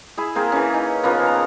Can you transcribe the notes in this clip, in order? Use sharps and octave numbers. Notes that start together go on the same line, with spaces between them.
E4 G#4
A#3 C4 G#4 A#4
E3 C#4
D#4
C#3 F3 A#3 B3
A#5